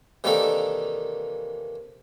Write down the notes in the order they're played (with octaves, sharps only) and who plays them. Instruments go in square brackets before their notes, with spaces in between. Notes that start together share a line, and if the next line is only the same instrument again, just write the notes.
[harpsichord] C3 D#3 E3 A#3 D4 A4